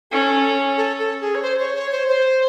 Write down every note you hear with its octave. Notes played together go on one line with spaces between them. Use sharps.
C#4 A4
A4
A4
G#4
C#5
C5
C#5
C#5
C5
C5